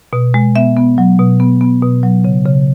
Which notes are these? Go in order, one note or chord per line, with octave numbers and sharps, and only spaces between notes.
B2
G#3
B3 E5
B3
F#3
B2
B3
B3
B2
F#3
C#3
C#3